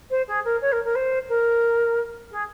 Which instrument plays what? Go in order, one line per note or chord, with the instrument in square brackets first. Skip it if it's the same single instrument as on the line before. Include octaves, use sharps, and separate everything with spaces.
[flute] C5
G#4
A#4
C#5
A#4
A#4
C5
A#4
G#4